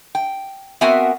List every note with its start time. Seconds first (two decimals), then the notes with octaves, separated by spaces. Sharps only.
0.15 G5
0.81 B3 C4 F#4 A#4 E5 G#5